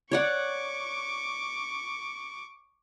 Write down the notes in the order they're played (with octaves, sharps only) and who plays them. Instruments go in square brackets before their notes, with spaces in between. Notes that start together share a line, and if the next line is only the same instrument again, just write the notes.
[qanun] C#5 D5 F#5 [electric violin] C#6 D6